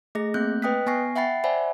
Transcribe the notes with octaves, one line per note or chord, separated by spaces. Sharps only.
A3 G#4 D#5 A#6
A3 A#3 C4 F#6 G6
B4 D#5 G5 D#6 F#6 B6
B3 G#5 C#6 A#6 C7
E5 F#5 G5 B5 A6 C7
C5 D5 E5 F#5 G#5 B5